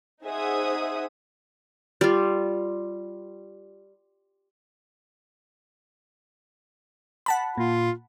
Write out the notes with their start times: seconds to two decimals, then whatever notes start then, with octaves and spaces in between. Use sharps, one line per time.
0.24 D#4 G#4 C5 E5 F#5 D#6
2.01 G3 F4
7.26 F#5 A5 B5
7.58 A#2 F4